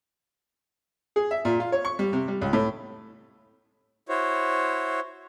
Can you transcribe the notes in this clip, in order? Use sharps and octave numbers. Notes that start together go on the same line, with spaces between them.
G#4
E5
A#2
F4
C#5
C#6
G3
C3
G3
C#2
A2
E4 F#4 C5 C#5